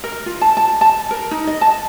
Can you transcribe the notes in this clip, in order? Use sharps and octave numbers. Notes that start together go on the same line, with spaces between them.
A#4
F4
A5
A5
A5
A#4
D#4
D#5
A5